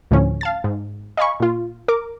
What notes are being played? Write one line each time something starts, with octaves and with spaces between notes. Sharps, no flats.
D2 A2 D3 F3 C#4
F5 A5 A6
G#2
D#5 F5 G#5 B5 C#6
A#2 F4
A#4 D6